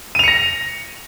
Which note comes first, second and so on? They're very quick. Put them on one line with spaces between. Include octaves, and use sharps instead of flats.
D#7 F7 C#7 A#6